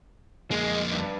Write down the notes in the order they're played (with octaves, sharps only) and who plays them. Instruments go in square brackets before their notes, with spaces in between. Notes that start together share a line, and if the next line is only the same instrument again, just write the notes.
[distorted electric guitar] F2 A#3 [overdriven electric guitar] G#3
[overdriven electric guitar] G2